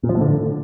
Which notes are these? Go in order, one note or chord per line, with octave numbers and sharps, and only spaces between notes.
A#2
F3
A2
D3